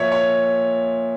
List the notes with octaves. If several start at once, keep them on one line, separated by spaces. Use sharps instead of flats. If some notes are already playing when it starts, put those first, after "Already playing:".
Already playing: A#2 F3 A#3 C#5 E5
C#5